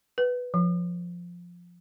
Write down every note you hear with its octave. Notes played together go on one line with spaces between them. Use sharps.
B4
F3